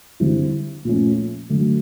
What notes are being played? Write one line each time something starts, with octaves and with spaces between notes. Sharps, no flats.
D3 G3 C4 E4
A#2 F3 A3 C#4
D3 F#3 A3